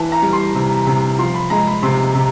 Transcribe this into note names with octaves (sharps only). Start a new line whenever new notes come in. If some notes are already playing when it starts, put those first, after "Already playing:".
Already playing: E3 A5
A#5
G3
C6
C3
C3
F3 C6
B5
G#3 A#5
B5
C3 C6
C3